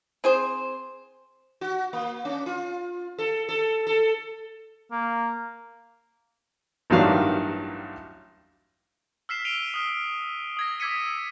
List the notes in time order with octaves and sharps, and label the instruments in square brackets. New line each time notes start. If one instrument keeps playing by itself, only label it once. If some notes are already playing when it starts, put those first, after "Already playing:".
[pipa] C4 G#4 C5
[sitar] F#4
A#3
C#4
F4
A4
A4
A4
[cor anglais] A#3
[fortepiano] A1 G2 D#3 F#3 D4 F5
[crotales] E6 F6 B6 C7 E7
D7 D#7 F7 G7
D#6 F6
D#6 G#6 A#6
D6 E6 G#6 B6 C#7 D#7